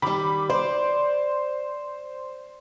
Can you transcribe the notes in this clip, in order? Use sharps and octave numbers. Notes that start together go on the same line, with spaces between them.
D#3 G3 B5 D6
C5 D5